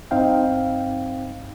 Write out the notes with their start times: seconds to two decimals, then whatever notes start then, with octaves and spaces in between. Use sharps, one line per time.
0.11 G2 C4 D#4 F5 G5